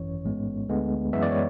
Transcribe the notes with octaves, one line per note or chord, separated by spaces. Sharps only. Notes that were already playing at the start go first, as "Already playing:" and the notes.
Already playing: G#1 F#2 E3 C#4 C#5
A1 G#2 G#3 B3
D2 D3 G#3 B3
F#2 E3 G#3 B3 E5
D5
C#5